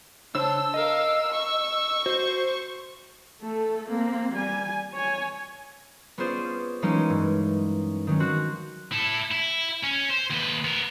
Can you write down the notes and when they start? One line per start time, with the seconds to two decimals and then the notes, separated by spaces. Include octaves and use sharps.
0.35 C#3 D4 C5 C#5 A5 E6
0.74 A#4 D#5 F5
1.32 C#6
2.06 F#4 C5
3.42 A3 A4
3.89 A#3 C4
4.32 G3 G#5
4.94 C#5 G#5
6.18 B3 C#4 F4 G#4 C5 D5
6.82 E3 F#3 G#3 A#3 C#4 D#4
7.10 G2
8.07 D#3 F#3 C#4
8.20 C4 F#4 F#6
8.92 E4 A4
9.31 E4
9.84 C#4
10.10 C5
10.31 D#2 B4
10.65 B3 A#4